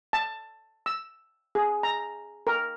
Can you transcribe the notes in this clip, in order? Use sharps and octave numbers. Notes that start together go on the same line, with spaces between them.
A5
E6
G#4
A#5
A#4